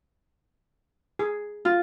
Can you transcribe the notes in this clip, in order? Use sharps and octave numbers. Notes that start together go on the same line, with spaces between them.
G#4
F4